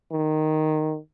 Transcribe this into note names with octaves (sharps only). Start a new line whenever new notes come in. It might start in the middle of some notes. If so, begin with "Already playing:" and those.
D#3